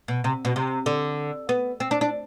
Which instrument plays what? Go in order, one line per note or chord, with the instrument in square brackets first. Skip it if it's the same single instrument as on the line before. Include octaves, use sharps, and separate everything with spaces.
[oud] B2
C3
B2
C3
D3
B3
C4
D4
D4